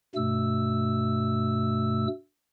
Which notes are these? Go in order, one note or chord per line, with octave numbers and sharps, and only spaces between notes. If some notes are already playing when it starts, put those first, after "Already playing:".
G2 B2 A3 E6